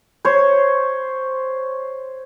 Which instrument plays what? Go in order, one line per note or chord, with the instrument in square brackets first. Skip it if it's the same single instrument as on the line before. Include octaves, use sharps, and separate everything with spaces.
[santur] C5 C#5